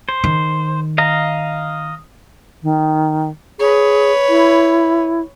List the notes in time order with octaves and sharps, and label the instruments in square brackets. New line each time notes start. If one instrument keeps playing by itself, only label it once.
[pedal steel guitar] C5
[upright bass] D#3
[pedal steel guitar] D#5 F5 A#5
[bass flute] D#3
[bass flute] G#4 [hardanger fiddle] B4 C#5
[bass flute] E4